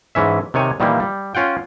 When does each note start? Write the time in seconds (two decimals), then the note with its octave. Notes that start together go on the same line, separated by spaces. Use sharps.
0.15 G#2 E3 C#4 E5
0.54 C3 D#3 C#5 G#5
0.80 A#2 D#3 E3 G3 A#3
1.00 G3
1.35 C#4 F4 F#5 G5